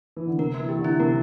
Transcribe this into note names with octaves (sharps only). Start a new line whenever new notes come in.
E3
D3
C3 A#4
E3 A#3
G4
D3
E4
C3 A#4